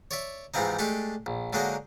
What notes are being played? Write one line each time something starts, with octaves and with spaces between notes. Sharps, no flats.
C#5 D5 E5
G#2 C3 E3 F3 C4 D#4
G#3 A3 D4 G4 A4
A#1
D3 F#3 G#3 A#3 D4 D#4